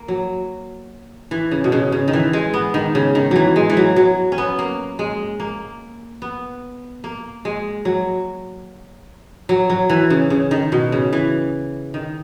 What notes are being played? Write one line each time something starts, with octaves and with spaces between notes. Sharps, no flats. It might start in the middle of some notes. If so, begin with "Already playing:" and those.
Already playing: A#3
F#3
E3
C#3
B2
C#3
C#3
D#3
E3
G#3
B3
D#3
C#3
D#3
E3 F#3
G#3
E3
F#3
F#3
C#4
B3
A#3
G#3
A#3
B3
A#3
G#3
F#3
F#3
F#3
E3
C#3
C#3
D#3
B2
C#3
E3
D#3